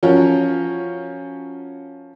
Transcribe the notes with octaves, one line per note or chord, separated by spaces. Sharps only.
F3 C#4 F4 F#4 A#4 C#5